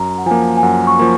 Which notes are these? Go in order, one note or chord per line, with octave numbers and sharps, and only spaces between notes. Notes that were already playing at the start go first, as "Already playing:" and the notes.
Already playing: F#2 A#5
F#5
F3 A#3 G#5
G#5
F#2 F#5
C#6
F3 A#3